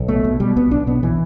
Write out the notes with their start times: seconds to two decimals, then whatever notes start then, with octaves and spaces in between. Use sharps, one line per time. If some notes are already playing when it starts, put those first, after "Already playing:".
Already playing: B1
0.08 B2 A3
0.24 B2
0.40 B2 G3
0.56 B1 B3
0.71 B1 D4
0.87 B2 B3
1.03 B2 E3